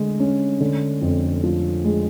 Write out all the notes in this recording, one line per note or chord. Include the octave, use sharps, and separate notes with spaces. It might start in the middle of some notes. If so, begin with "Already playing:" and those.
Already playing: D3 G#3
C#4
D3
F2
F3
G#3